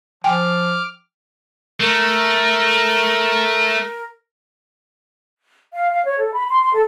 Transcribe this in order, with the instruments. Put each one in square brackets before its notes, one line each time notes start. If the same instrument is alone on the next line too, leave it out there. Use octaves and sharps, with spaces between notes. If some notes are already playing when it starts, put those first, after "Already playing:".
[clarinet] F3 [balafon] G5 G#5 [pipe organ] D6 F6
[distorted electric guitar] A3 [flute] A#4
[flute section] F5
F5
C#5
A4
B5
C6
C6
A4